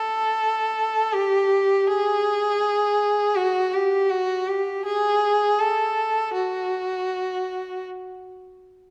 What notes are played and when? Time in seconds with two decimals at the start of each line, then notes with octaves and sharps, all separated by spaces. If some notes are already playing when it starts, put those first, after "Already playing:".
Already playing: A4
1.13 G4
1.88 G#4
3.36 F#4
3.74 G4
4.10 F#4
4.48 G4
4.86 G#4
5.60 A4
6.34 F#4